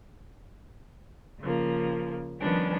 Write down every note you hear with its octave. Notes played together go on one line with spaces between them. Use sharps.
C#3 F3 A#3
D#3 F3 G3 B3 C#4 D4